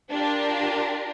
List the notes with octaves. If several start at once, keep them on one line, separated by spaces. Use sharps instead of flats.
D4 F4 G4 A#4